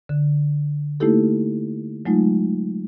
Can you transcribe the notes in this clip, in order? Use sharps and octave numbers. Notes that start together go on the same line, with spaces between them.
D3
A3 A#3 D#4 E4 G4 A4
F#3 G#3 A3 D#4 F4